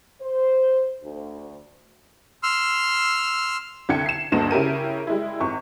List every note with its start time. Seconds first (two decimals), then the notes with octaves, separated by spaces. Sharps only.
0.21 C5
1.02 D2
2.43 C6 E6 F6
3.89 C2 D3 G5 G#6 C#7
4.06 C7 E7
4.32 D2 G2 A#3 D#5 E7
4.51 C#3 E4 G4 A#4 D#7
5.07 G3 G#3 E4
5.40 G#1 C#6